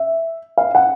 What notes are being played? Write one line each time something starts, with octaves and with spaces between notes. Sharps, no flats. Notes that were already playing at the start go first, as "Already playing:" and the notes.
Already playing: E5
F5
F#5